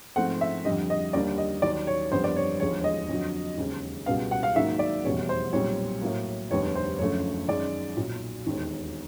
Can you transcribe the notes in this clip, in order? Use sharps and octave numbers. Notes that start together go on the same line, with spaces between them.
G#2 F3 A3 C4 F#5
E5
F2 D3 G3 D#5
D#5
D#2 D3 G3 A#3 D5
D#5
D#2 D#3 F#3 D5
C#5
G1 F2 D3 G3 B3 C5
D5
C#5
E1 D#2 D3 F3 G#3 C#5
D#5
F2 D3 F#3
E1 D#2 C#3
C#2 B2 G3 B3 F5
F#5
F5
G#2 D#3 F#3 A#3 E5
D5
F1 E2 B2 G3 C#5
C5
B1 A#2 G3 C4 C#5
A2 F#3 A#3
F1 D#2 D3 G3 B3 C#5
C5
F#1 F#2 D3 F3 A3 C#5
F#2 D#3 G#3 D5
B1 A#2 F#3
E1 D#2 D#3